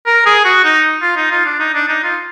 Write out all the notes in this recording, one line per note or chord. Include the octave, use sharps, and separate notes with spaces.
A#4
G#4
F#4
D#4
F4
D#4
F4
D4
D#4
D4
D#4
F4